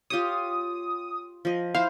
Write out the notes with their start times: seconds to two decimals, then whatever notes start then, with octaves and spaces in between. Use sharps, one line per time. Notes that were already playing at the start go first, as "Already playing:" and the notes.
0.10 F4 G4 C#5 D#6
1.45 F3 D#5
1.75 E4 C5 F5